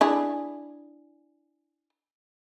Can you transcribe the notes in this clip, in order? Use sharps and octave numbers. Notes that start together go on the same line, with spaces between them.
D4 E4 G#4